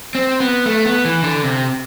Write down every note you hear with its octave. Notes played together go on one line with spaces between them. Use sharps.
C4
B3
A3
B3
E3
D3
C3